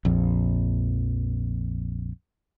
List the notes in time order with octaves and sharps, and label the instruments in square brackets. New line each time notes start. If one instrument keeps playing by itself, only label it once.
[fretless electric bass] A#1 F2